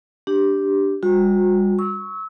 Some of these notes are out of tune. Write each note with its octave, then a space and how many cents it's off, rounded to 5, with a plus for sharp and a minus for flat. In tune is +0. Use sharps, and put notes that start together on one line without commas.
D4 +0 G4 +0
G3 +35 F#4 -40
C#6 +0 E6 -30